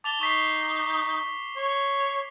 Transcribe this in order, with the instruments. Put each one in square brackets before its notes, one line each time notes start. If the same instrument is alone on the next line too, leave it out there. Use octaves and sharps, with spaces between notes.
[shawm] A5 [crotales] D6 F7 G7
[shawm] D#4 [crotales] C#6 B6 C7
[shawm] C#5